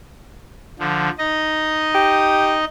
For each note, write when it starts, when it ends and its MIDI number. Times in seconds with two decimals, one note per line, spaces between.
0.79 1.09 50
0.79 1.09 53
1.18 2.65 63
1.18 2.65 75
1.95 2.56 67